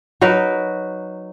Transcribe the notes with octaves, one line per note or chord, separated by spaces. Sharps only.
F#3 D#4 A#4 B4